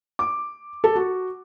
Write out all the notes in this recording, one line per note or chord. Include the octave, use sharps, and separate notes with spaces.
D6
A4
F#4